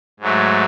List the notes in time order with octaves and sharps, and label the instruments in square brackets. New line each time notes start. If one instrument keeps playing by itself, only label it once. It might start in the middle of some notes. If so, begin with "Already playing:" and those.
[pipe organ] G#2 F#3 A3